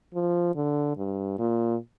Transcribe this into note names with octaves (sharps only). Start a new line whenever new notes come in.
F3
D3
G2
A#2